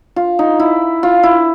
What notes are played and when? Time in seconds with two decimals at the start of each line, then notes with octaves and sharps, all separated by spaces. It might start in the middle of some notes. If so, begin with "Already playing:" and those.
0.16 F4
0.39 D#4
0.60 E4
1.03 F4
1.23 E4